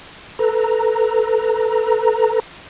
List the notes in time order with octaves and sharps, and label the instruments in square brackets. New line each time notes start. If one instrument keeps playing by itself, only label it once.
[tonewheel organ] A4 B4 A#5